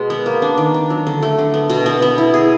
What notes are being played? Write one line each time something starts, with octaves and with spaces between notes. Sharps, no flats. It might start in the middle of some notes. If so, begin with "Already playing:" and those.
Already playing: B2 G#3
B3
A#3
D4
D#3
D4
F#3
D3
A3
D3
B3
B2
B3
B3
E4
G#4